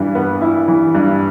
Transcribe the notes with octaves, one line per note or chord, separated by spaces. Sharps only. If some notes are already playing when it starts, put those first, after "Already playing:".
Already playing: G2 E3
B3
E4
E3
G2